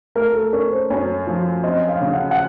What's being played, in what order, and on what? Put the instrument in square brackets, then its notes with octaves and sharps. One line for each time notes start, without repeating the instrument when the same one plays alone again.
[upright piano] A3 [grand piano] A#4
[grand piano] A4
[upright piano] C#4 [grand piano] A#4
[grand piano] C5
[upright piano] F#2 [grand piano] C#5
[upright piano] F3
[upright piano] C4 [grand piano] D#5
[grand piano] F5
[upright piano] C#3
[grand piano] F#5
F#5